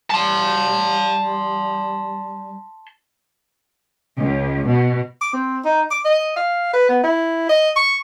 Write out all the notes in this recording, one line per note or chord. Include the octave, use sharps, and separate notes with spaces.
G3 A5 C6
C#2
B2
D6
C4
D#4
D6
D#5
F5
B4
B3
E4
D#5
C#6